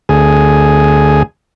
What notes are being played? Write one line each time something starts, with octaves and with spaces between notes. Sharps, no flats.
D2 G#4